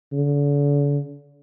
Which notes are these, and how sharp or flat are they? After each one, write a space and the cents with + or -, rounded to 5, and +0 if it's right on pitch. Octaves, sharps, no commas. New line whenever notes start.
D3 -40